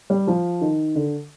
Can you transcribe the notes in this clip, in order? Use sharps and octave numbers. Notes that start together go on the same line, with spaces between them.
G3
F3
D#3
D3